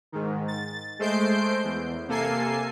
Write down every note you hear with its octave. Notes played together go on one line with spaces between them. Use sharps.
G#2 D#3
A6
G#3 A3 C5 G6 C7 D7
E2
C3 A#3 A4 G#5 C7